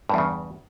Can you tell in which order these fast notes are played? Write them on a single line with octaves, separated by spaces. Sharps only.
G2 E2 C#3